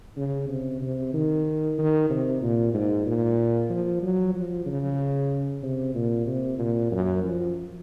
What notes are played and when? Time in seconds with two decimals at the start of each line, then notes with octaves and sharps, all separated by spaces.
0.17 C#3
0.49 C3
0.82 C3
1.14 D#3
1.78 D#3
2.10 C3
2.42 A#2
2.74 G#2
3.06 A#2
3.70 F3
4.03 F#3
4.35 F3
4.66 C#3
5.63 C3
5.95 A#2
6.27 C3
6.59 A#2
6.92 F#2
7.24 F3